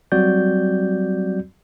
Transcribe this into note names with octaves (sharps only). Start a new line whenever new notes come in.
F#3 G3 C4 F#4 D5 G6